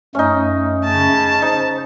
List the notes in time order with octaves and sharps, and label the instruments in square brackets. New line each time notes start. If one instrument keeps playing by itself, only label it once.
[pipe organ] F#2 A3 [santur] C#4 D#4
[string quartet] C#3 A5
[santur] D#4 [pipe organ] C5